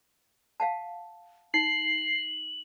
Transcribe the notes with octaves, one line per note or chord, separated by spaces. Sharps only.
F5 F#5 A5
D#4 C7 F#7